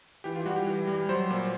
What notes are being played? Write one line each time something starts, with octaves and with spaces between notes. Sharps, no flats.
E3 G4
F4
G3 F#4
G4
E3
G3
F#3 C5
A#2